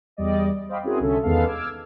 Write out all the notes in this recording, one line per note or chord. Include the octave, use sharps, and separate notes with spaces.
E2 G3 D5 D#5
C5 D#5 F5 G5 B5 D6
C4 C#4 E4 F#4 G#4 A#4
C2 D3 C#4 A4 E5
E2 D#3 G#3 B3 A4 F5
D6 E6 F6 G#6